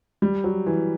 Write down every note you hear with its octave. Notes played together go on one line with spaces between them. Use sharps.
G3
F#3
E3